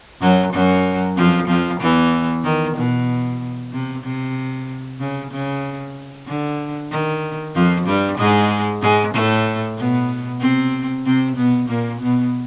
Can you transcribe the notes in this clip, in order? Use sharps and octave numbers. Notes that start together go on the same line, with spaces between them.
F#2 F#3
F#2 F#3
F2 F3
F2 F3
E2 E3
D#3
B2
C3
C3
C#3
C#3
D3
D#3
F2 F3
G2 G3
G#2 G#3
G#2 G#3
A2 A3
B2 B3
C3 C4
C3 C4
B2 B3
A#2 A#3
B2 B3